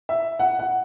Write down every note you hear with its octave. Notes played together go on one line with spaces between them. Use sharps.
E5
F#5
F#5